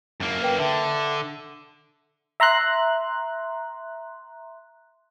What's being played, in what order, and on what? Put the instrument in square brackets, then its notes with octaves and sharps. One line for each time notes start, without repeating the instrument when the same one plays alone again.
[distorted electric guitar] F#2 A#3
[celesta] B4 G5
[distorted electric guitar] D3 [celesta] E5
[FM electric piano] E5 A#5 C6 F#6